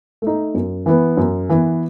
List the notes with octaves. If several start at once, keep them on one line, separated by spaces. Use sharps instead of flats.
A3 D#4
F#2
E3 B3
F#2
E3 B3